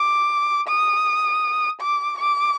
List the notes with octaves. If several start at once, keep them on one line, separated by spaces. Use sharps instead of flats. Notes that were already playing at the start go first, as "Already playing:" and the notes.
Already playing: D6
D#6
D6
D6